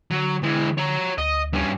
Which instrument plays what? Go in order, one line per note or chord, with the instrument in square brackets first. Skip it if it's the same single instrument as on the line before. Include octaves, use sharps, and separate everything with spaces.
[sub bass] D3 [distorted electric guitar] F#3
[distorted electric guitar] E3 G#3
C#5 A#5
[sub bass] D2 [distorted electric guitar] D#5
[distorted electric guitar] G2 C#4